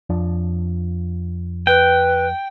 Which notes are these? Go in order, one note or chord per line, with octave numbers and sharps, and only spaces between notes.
F2 F3 D4
B4 G5